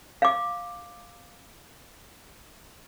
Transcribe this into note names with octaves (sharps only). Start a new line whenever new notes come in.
F5 D6